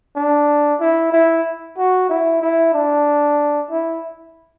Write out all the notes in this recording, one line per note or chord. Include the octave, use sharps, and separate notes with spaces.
D4
E4
E4
F#4
E4
E4
D4
E4